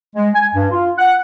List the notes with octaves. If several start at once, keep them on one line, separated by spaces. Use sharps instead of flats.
G#3
G#5
G2
F4
F#5